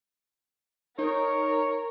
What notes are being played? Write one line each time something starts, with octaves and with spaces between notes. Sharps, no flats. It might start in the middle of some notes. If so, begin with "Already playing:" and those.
D#4 A#4 C#5